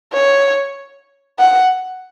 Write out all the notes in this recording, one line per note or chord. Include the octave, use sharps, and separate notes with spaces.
C#5
F#5